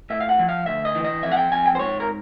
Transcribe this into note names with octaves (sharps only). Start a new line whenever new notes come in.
A2 E5
F5
F#5
F3
F5
D2 E5
D#5
E3
D#5
F2 E5
F#5
G5
F2 G#5
G5
C5
G#2 C#5
A#4